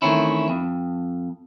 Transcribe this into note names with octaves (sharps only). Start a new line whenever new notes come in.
D#3 E3 A3 C4 C#4 E4
F2